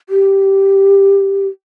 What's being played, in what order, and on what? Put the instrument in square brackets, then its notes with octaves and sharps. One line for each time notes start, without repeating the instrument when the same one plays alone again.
[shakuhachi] G4